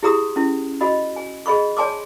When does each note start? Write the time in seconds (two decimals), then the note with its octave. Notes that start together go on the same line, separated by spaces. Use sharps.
0.03 E4 G4 G#4 A#5 C6 D#6
0.36 C#4 E4
0.81 F#4 D#5 B5
1.16 G#5
1.46 G#4 D#5 B5 C#6
1.77 C#5 D5 G#5 A5 C6 D6